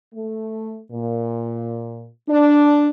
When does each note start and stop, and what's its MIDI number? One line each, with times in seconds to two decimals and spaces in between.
0.14 0.81 57
0.91 2.07 46
2.29 2.88 62